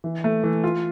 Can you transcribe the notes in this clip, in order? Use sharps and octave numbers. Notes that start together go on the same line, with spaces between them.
E3
A3
E3
F4